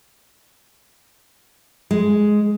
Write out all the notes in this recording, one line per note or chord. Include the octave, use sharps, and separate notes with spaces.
G#3